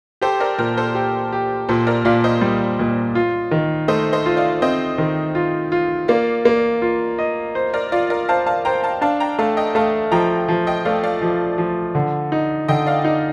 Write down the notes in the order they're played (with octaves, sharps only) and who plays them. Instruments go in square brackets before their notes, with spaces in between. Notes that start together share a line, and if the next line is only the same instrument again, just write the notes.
[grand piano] G4 [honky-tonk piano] A4 C5
[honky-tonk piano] A#4 D5
[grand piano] A#2 [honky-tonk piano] G4 A#4
[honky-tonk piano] A4 C5
[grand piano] G4
G4
[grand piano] A#2 [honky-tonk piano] A4 C5
[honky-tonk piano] A#4 D5
[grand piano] A#2 [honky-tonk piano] D5 F5
[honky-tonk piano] C5 D#5
[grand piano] G3
A#2
F4
D#3
[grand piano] A3 [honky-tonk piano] C5 D#5
[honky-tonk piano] C5 D#5
[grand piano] F4
[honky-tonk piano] D5 F5
[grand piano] C4 [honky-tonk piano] C5 D#5
[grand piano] D#3
F4
F4
[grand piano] A#3 [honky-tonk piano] D5 F5
[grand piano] A#3
F4
D#5
C5
[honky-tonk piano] A#4 D5
[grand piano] F4 [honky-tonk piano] D5 F5
[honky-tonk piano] A#4 D5
[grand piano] C5 [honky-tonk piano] F5 A5
[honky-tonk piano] F5 A5
[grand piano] C5 [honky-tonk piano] G5 A#5
[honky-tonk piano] F5 A5
[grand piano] D4 [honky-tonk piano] F5 A5
[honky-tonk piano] G5 A#5
[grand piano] A3 [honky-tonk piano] F5 A5
[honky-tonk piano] D#5 G5
[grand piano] A3 [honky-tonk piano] F5 A5
[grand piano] F3 [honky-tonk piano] G5 A#5
[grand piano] F3
[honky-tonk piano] D#5 G5
[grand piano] A3 [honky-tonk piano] D5 F5
[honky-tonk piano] D5 F5
[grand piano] F3
F3
D3
D#4
[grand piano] D3 [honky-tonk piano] D#5 G5
[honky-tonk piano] D5 F5
[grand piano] D#4